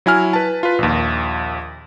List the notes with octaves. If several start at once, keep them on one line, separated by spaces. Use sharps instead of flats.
F#3 E4 G#5 F6
B4 A5
F4 B4
A#1 D#2